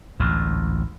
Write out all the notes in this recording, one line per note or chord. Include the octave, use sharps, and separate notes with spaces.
A1 D2 G#2